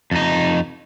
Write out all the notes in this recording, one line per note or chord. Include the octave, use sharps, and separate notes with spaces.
F2 D#4